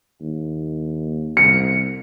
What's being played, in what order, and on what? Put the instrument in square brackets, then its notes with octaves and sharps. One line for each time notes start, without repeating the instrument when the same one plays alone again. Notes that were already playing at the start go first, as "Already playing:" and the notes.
[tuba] D#2
[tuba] C2 [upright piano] C#7